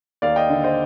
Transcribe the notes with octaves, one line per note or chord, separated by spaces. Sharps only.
D#2 D5 F5
D#5 G5
D3
C5 D#5